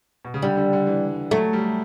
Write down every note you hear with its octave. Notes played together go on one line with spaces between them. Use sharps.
B2
C#3
D3 G3
D3
D3
E3
F#3 A3
G3